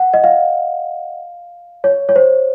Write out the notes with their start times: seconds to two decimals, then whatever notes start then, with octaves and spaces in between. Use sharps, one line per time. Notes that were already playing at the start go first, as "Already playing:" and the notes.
Already playing: F#5
0.14 D#5
0.24 F5
1.84 C#5
2.09 C#5
2.16 C5